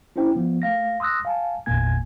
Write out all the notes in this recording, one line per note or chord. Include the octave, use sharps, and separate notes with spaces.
C#4 D4 E4 C5 G5
F3 B3
A3 F5 A#6
C6 D#6 E6 F#6 A#6
F5 G#5 A5
G#1 E2 A#2 A#3 G#5 G#6